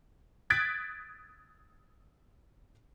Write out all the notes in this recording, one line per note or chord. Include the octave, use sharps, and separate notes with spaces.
D#6 F#6 G#6 A6 B6 D7